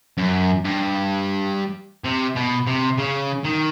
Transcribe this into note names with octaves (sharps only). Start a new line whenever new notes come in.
F#2
G2
C3
B2
C3
C#3
D#3